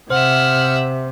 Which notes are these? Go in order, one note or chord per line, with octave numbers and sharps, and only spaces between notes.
C3 C5 E5 F#5 F6